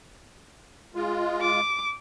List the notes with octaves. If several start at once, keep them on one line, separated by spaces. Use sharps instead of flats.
G#3 F4
D6